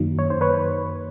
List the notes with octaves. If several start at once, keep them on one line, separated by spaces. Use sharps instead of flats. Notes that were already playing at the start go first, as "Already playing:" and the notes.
Already playing: F#2 D#3 F#3 A#3
C#5
C5
B4 C#5